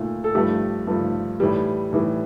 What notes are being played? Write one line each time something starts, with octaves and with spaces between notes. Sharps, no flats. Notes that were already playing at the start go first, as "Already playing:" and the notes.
Already playing: A#2 A3
A4
G2 F3 A3 G4
G2 F3 A3
A2 E3 G3
A2 E3 G3